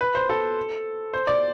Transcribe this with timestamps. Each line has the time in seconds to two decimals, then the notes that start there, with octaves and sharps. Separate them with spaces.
0.01 B4
0.15 C5
0.29 A4
1.13 C5
1.27 D5